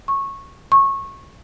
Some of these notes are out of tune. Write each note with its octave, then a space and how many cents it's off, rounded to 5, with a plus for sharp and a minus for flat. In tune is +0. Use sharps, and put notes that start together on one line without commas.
C#6 -15
C#6 -20